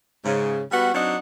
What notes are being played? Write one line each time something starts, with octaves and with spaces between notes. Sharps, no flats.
G#2 C#3
G3 B3 F#4
F#3 C4 D4 D#4 F#5